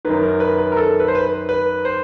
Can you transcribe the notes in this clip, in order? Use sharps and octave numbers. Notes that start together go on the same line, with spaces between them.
F#2 D#3 B4
A#4
B4
B4
A#4
A4
B4
C5
B4
B4
C5